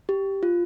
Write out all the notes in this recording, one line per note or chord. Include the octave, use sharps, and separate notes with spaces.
G4
F4